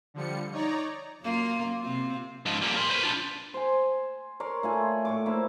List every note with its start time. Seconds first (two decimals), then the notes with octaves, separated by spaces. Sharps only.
0.14 D3 F3 G3 C#7
0.52 D#4 C#5 D5 A#5
1.22 F#2 A#3 F4
1.81 C3 C4 F4
2.46 G#2 F3
2.62 G3 A#3
2.76 A#4 C6
2.90 B4 C5
3.03 D4 F4
3.54 C5 G#5
4.40 A#4 C#5 D5 C6
4.63 A3 F4 G#5
5.05 A2 C#6 D6
5.26 A#3 E4 C5